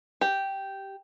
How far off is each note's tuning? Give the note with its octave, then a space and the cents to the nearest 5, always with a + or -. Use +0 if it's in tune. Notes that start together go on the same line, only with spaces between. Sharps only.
G4 -5